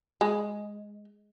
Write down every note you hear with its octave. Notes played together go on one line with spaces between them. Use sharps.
G#3